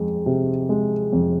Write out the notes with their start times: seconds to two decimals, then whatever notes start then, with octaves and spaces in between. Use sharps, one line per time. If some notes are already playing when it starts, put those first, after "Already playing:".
Already playing: F2 G#3
0.26 C3
0.69 G#3
1.13 F2